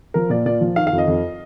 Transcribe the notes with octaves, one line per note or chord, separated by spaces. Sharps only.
F3 A#4
A#2 D5
A#2 D5
F3
D#3 F5
F5
F2
D#5
F2